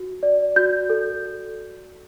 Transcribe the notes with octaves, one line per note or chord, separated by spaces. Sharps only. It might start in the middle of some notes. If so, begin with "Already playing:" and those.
Already playing: F#4
D5
F#4 G6
A4